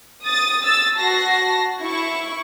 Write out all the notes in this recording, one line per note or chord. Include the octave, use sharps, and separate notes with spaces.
D#6 A6
E6 A6
F#4 A5 A#6 C7
E4 C#6